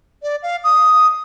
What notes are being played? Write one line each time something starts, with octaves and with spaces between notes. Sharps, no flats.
D5
F5
D#6